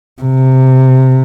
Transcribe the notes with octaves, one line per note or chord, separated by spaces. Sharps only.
C3